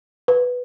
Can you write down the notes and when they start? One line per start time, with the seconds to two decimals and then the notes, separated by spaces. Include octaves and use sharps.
0.28 B4